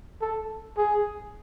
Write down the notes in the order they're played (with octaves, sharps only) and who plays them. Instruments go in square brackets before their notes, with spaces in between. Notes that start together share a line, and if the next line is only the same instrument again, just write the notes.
[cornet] A4
G#4